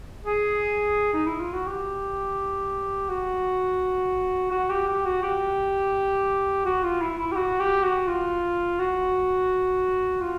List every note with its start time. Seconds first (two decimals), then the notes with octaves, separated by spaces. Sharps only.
0.25 G#4
1.14 D#4
1.26 E4
1.40 F4
1.53 F#4
1.67 G4
3.09 F#4
4.51 F#4
4.70 G4
4.88 G4
5.05 F#4
5.23 G4
6.65 F#4
6.83 F4
7.01 E4
7.18 E4
7.32 G4
7.36 F#4
7.60 G4
7.83 F#4
8.08 F4
8.79 F#4
10.21 F4